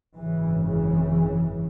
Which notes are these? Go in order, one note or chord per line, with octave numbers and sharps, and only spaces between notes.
G#1 F#2 C#3 E3
E3